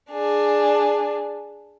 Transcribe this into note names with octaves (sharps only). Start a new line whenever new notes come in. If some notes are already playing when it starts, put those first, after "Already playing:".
D4 G#4